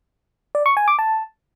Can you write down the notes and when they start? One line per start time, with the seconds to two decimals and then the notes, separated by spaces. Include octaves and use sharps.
0.55 D5
0.66 C#6
0.77 G#5
0.88 D6
0.99 A5